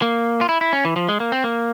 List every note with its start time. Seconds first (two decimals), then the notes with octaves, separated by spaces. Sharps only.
0.02 A#3
0.41 F4
0.49 E4
0.61 E4
0.73 C#4
0.85 E3
0.96 F3
1.09 G#3
1.20 A#3
1.32 C4
1.44 A#3